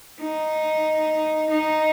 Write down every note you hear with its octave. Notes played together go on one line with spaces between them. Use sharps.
D#4
D#4